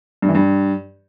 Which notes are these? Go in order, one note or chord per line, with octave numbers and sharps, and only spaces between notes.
G2
E3
G2